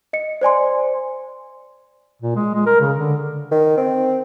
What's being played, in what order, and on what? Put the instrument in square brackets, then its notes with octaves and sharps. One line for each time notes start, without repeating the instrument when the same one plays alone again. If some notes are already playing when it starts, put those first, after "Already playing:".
[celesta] D#5 C#7
C5 D5 G#5 C6
[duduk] A#2
G#3
G#3
A#4
C#3
D3
[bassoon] D#3
C4